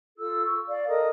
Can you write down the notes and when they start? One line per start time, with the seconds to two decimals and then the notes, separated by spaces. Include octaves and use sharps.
0.17 F4 A4 E6
0.45 C#6
0.67 D5 F5
0.87 A4 A#4 D#5 D#6